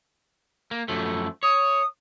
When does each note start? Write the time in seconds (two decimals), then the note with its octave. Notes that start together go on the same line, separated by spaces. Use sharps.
0.71 A#3
0.88 F#2 F3 A3
1.43 C#5 D#6